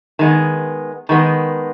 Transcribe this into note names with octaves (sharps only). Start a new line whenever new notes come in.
D#3 G#3 B3
D#3 G#3 B3